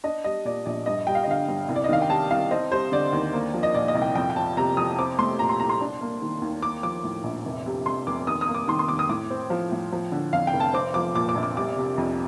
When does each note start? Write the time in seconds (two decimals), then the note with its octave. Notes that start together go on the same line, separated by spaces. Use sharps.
0.04 D4 D#5
0.24 G3 D#5
0.45 A#2 D5
0.66 A#1 D5
0.86 G2 D#5
1.07 G3 G5
1.15 F5
1.23 D#5
1.27 D3 F5
1.48 G2
1.69 C2
1.76 D5
1.84 D#5
1.89 D#3 F5
2.02 G5
2.09 C3 A5
2.30 C2 F5
2.51 C4 D#5
2.71 G3 C5
2.92 D3 D5
3.13 D#2
3.33 A#3
3.54 F3
3.63 D#5
3.75 A#2 D5
3.88 D#5
3.95 C2
4.02 G5
4.15 F2 G5
4.30 G5
4.36 F3 A5
4.57 C3 A#5
4.77 F2 D#6
4.98 C4 D6
5.19 A3 C6
5.39 A#2 A#5
5.49 C6
5.60 C2 A#5
5.69 C6
5.81 D4
6.01 A#3
6.22 D#3
6.42 D#2
6.63 A#3 D6
6.83 F3 D6
7.04 A2
7.24 A#1
7.46 F1
7.66 C3
7.86 F2 C6
8.07 F1 D6
8.27 D#2 D#6
8.41 D#6
8.47 A#3
8.54 D6
8.68 D#3 C6
8.79 C6
8.88 D#2 D6
8.99 D#6
9.09 A2 D6
9.30 C4
9.50 F3
9.72 A2
9.92 F3
10.12 D3
10.33 F2 F5
10.47 G5
10.53 F1
10.60 A5
10.74 C4 D6
10.94 F3 D6
11.15 A#2 D6
11.29 D6
11.35 A#1
11.43 D6
11.57 G3 D6
11.77 C3
11.98 F2